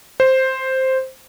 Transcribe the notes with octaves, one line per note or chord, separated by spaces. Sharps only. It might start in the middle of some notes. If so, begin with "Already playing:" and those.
C5